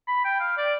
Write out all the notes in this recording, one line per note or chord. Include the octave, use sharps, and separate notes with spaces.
B5
G5
F5
D5